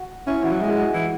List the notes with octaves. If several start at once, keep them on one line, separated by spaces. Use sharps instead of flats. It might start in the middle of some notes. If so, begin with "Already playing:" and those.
Already playing: F#4
C#4 E4
E3 F#4
F#3
G#3 E4
G#4
F#4
E3